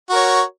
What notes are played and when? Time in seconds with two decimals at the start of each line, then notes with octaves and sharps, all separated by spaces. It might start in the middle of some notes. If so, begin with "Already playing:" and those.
0.10 F#4
0.13 A#4
0.15 C#5